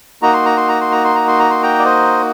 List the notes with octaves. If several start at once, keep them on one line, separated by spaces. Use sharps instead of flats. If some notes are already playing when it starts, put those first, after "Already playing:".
A#3 D#4 F#4 A#5
C6
A#5
C6
A#5
C6
A#5
C6
A#5
C6
A#5
C6
G5 A#5
D5
C5 D#5